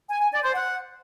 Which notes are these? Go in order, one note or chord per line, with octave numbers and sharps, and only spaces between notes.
G#5
G#5
D5
C5
F#5